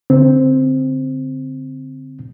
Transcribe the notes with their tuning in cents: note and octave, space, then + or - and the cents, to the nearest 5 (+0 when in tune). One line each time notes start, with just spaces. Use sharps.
D3 -30 C4 +0